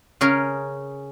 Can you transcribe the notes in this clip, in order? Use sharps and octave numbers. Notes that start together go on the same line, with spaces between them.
C#3 C#4 G#4 A#4